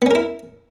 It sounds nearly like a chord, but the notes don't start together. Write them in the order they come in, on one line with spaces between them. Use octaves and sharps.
B3 C#4 A#4 E4